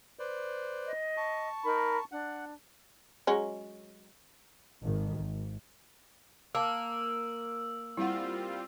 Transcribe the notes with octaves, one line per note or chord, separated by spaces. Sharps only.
B4 C5 D5
D#5
A5 C#6
D#4 A#4 B5
D4 F#5
F#3 G#3 C#4
G#1 D#3
G#1
A#3 F5 A5 D6 E6
G3 C4 E4 F4 F#5